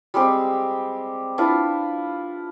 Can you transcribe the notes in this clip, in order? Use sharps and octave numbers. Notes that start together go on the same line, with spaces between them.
G3 G#3 C4 G4
D4 E4 F4 B4